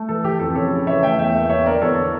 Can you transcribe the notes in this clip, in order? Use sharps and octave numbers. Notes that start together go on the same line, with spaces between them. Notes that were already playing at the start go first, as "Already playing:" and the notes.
Already playing: A3
E3 A4
E3 G4
F2 A4
C#3 A4 C#5
C#3
E3 C#5 E5
A3 E5 G5
E2 E5 G5
A#3
E2 C#5 E5
D3 A#4 D5
E2 A4 C#5